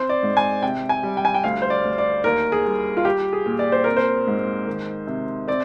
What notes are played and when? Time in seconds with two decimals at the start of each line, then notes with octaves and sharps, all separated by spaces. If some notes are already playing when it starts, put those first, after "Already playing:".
Already playing: C4 C5
0.09 D5
0.23 G#2
0.37 G#5
0.62 C3 G5
0.89 G#5
1.03 G3
1.17 G5
1.25 G#5
1.34 G5
1.44 D2 F5
1.62 C5
1.70 D5
1.84 D2
1.98 D5
2.24 D#2 A#4
2.52 G#4
2.66 G3
2.97 F4
3.05 G3 G4
3.33 G#4
3.46 A#2
3.59 D5
3.72 C5
3.84 C4 A#4
3.97 C5
4.27 G#2
4.67 D#3
5.07 C3
5.48 C4 D5